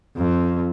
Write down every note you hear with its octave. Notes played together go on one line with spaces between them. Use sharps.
F2